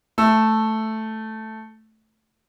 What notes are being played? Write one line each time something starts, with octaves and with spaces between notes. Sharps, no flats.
A3 E6